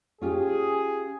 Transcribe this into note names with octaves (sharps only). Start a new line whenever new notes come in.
C#4 F4 G4 G#4